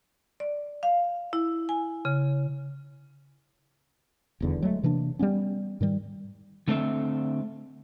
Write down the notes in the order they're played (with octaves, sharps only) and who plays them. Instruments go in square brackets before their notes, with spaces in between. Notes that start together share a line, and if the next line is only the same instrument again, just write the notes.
[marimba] D5
F5
E4
G#5
C#3
[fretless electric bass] D#1 E2 D3
F#3 G#3 A3
C3 E3 A#3 D4
G3 G#3 B3 C#4
G#2 D#3 G3
[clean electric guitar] D3 A3 C4 E5